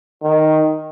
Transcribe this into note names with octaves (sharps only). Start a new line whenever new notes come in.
D#3